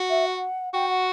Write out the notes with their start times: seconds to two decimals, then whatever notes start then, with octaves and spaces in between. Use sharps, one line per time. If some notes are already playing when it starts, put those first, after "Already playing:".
Already playing: F#4
0.09 E5
0.25 F#5
0.73 F#4 G5
0.89 F#5